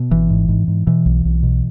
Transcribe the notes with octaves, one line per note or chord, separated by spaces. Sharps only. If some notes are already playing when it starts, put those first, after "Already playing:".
Already playing: B2
G#1 E3
G#2
G#2
G#2
B2 E3
B1
B1
B2